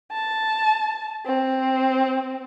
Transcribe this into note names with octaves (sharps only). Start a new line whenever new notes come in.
A5
C4